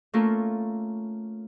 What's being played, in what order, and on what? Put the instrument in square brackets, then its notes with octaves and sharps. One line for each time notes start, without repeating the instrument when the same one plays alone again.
[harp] A3 A#3 C#4 F4 A4 A#4